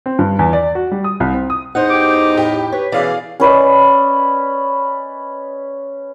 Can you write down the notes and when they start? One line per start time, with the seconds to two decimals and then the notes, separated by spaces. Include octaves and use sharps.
0.06 C4
0.19 G2
0.39 E2
0.53 D5
0.75 F#4
0.92 G3
1.04 D#6
1.20 C2
1.34 C4
1.50 D#6
1.75 E2 D#4 C5 F#5
1.90 G4 G5 D6
2.37 A2 G4
2.72 B4 C#5
2.92 B2 E3 C#4 G#4 D5 F5
3.40 C#4 B4 D5 D#5